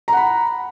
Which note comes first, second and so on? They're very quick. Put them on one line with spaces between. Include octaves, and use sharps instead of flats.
A#5 F#5 B5